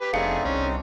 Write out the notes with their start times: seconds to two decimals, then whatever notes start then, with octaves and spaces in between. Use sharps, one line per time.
0.01 G4 B4
0.13 F1 A3 C4 D4 D#4 G#4 F5 C#7
0.45 C2 C#4